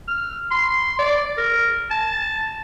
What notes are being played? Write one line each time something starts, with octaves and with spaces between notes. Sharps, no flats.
F6
C6
D5
A#4
A5